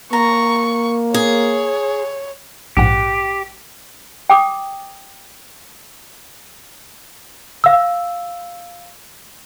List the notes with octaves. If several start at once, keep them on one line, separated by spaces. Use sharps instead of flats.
A#3 A#5 C#6
G#4 C#5
A#1 G#2 G4 F#5
G5 D6 D#6
F5 E6